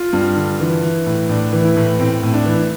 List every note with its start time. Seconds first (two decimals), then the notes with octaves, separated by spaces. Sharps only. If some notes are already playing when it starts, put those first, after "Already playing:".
Already playing: F4
0.13 G2
0.36 D3
0.60 E3
0.83 E3
1.06 A2
1.29 A2 D4
1.53 E3
1.64 E4
1.76 A2
1.99 A2 C4
2.23 A2
2.34 D4
2.45 E3